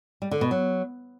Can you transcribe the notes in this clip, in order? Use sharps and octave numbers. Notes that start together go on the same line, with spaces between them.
G3
D3
B2
F#3